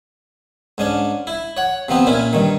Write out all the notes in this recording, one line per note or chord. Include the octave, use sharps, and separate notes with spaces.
G#2 C#4 D4
E4
C#5 F#5
C3 F3 B3 C4
A#2 C#4 E4
G2 D#3